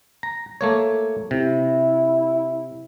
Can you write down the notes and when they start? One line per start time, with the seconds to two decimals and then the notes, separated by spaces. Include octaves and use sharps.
0.23 A#5
0.61 A3 A#3 C#5
1.31 C3 E4